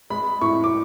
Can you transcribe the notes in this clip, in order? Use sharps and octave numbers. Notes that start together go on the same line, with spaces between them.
G#3 B5
A2 C#6
D6